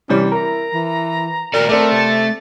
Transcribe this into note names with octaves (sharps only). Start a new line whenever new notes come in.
C3 E3 G3 C#4
E4 A#4 A#5
E3
A#2 F#4 A#4 D5
A3 C4 A4 D5
C3 A6